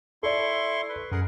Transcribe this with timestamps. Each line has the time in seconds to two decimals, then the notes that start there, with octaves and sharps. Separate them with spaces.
0.23 E4 A4 D5 C6 C#6
0.89 B4
1.12 F#2 G#4 A#4 F#5